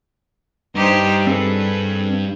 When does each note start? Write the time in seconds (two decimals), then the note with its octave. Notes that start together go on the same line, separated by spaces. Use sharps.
0.75 G2 D#4 G4 C5
1.27 C4 G#4 A4 B4